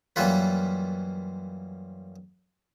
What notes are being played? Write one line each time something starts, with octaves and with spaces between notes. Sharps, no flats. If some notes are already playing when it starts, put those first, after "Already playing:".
F#2 E3 G3 A#3 F4 B4